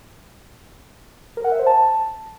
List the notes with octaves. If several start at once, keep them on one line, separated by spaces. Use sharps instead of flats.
A#4
F#5
E5
C5
A5